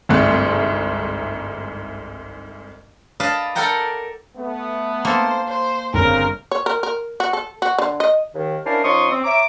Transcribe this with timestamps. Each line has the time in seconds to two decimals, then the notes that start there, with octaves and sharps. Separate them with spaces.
0.09 G1 C2 G#2 A3 F#6
3.20 B4 D5 D#5 F5 A5
3.55 A4 A#4 D5 F#5 G5 A#5
4.37 A3 B3
5.05 A#3 A4 C5
5.48 C5
5.94 G1 C#3 C4 A#4
6.52 C#5
6.66 A#4
6.83 A#4
7.20 F#4
7.33 A4
7.62 F#4
7.78 D3
8.00 D#5
8.34 D#2 D#3
8.65 C#4 D4 E4 A#4 C5 F5
8.84 F3 C#4 D#4 C6 C#6 D#6
9.10 C4
9.24 C#5 E5 A#5 D6